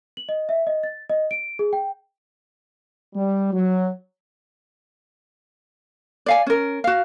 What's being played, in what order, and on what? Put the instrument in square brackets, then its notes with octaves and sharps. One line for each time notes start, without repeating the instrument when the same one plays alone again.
[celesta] F#7
D#5
E5
D#5
A6
D#5
D7
G#4
G5
[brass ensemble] G3
F#3
[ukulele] D5 F5 G#5
C#4 A#4
F#4 F5